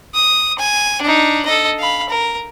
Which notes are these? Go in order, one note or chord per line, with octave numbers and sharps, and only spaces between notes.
D#6
G#5
D4 D#4
A4 D#5
F5 B5
A#4